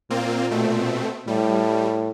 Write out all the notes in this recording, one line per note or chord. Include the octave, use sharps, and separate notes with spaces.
A#2 A#3 C4 F4
B2 A3 C4
A2 G3